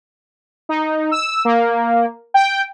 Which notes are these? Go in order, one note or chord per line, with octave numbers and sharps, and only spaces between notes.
D#4
E6
A#3
G5